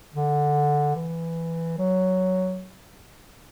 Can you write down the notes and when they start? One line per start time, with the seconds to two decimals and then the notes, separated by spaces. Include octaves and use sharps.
0.14 D3
0.96 E3
1.78 F#3